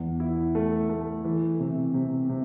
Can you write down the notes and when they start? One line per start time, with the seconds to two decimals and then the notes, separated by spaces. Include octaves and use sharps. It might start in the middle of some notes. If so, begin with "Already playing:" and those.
Already playing: E2
0.20 E4
0.55 A3
0.89 A3
1.25 E3
1.60 C3
1.94 C3
2.29 C3